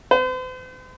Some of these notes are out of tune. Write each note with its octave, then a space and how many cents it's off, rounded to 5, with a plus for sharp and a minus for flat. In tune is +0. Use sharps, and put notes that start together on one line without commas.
C5 -45